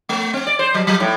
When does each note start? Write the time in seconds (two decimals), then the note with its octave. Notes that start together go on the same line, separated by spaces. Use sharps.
0.09 A3
0.33 C4
0.47 D5
0.59 C5
0.74 F#3
0.87 F#3
1.00 A2